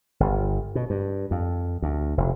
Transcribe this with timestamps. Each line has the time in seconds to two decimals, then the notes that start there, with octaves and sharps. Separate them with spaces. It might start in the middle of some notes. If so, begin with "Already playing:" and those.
0.20 G1
0.75 B2
0.90 G2
1.31 F2
1.82 D2
2.17 F1